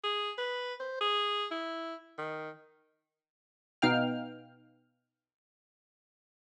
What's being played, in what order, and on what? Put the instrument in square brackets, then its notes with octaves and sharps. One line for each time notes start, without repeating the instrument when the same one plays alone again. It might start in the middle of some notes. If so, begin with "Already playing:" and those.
[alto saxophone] G#4
B4
C5
G#4
E4
D#3
[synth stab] B2 B3 D#4 F5 G5 F6